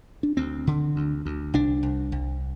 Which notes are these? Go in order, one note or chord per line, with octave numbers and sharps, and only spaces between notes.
D4
D2 C4
D3
D2
D2
C2 D4
C2
C2